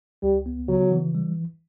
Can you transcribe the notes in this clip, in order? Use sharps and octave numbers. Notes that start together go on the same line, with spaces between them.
C#2 G3
B3
C#3 F#3
E3
G3